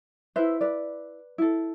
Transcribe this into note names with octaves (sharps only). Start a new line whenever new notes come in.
E4 B4 C5 E5
B4 D5
E4 A4